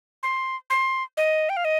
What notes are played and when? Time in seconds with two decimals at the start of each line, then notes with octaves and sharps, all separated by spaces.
0.23 C6
0.70 C6
1.17 D#5
1.49 G5
1.57 F5
1.65 D#5